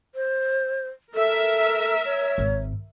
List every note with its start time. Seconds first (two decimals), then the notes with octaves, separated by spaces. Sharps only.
0.15 C5
1.15 A4 A#4 E5
2.05 C#5
2.38 G#1 G#2